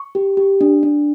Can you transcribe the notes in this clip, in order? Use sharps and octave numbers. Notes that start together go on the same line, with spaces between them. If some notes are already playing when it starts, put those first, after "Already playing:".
Already playing: C#6
G4
G4
D4
D4